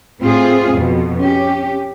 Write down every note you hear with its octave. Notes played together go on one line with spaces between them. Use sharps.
A2 C4 F4 G#4
F2 B2
C#4 G4